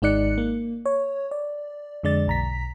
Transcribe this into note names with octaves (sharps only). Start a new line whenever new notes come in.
G#1 G#3 D#4 D5 F#6 C#7
A#3
C#5
D5
F2 D3 G#3 D5 A6
B1 A#5 B6